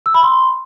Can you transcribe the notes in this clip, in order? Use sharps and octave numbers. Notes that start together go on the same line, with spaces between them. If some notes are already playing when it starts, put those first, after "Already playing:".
E6
B5
C6